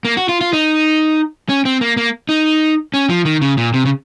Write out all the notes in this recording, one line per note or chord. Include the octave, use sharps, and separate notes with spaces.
A#3
F#4
F4
F4
D#4
C#4
C4
A#3
A#3
D#4
C#4
F3
D#3
C#3
A#2
C3
C#3